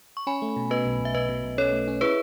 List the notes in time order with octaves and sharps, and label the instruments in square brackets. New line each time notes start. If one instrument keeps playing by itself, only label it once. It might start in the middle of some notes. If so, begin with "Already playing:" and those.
[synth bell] C#6
[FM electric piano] C#4 [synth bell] G#5 B5
[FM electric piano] A3
B2
[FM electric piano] B2 [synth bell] B4 D#5
[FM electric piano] B1
B1
[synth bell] E5
[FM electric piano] B1 [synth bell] B4 D#5
[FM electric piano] B2
B1
[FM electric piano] C#4 [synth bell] A4 C#5
[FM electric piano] A3
C#4
[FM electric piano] E4 [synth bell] G#4 B4